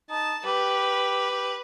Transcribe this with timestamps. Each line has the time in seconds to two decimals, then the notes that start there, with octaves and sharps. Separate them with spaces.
0.10 D#4 A5
0.45 G4 B4
1.30 G4